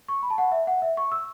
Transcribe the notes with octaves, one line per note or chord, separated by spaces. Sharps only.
C#6
B5
A5
F#5
E5
F#5
E5
C#6
E6